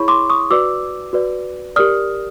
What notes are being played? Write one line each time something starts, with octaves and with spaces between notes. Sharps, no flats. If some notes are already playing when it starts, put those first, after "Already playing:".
Already playing: E4 G#4 C#5 B5 C#6
C6 D6
C#6 D#6
F#4 B4 D5 D6 E6
F#4 B4 D5
G4 A#4 D5 D#6 F6